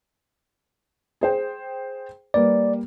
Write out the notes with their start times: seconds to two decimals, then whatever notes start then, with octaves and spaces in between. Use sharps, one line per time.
1.21 G#4 C5 G5
2.34 G3 A#3 B4 D5